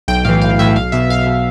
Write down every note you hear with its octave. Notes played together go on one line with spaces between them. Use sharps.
B1 G5
A2 E3 F5
B1 F5
A2 E3 E5
B1 F5
B2 E5
B1 F5
B2